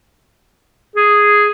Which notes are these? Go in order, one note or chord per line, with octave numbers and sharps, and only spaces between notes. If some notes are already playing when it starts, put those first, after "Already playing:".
G#4